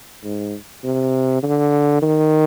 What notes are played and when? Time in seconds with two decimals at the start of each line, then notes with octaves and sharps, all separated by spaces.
0.24 G#2
0.84 C3
1.43 D3
2.02 D#3